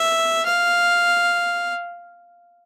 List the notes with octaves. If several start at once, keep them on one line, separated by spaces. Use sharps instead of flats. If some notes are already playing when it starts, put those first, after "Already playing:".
Already playing: E5
F5